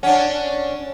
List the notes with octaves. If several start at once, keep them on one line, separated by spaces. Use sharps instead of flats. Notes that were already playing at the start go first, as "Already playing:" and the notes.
C#4 D4 F#5